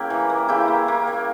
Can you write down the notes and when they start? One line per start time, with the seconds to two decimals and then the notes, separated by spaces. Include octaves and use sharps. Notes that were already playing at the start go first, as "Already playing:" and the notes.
Already playing: C#3 A#3 E4 G4
0.10 E3
0.30 A#3
0.48 C#3 E4 G4
0.68 A#3
0.88 A#3
1.07 A#3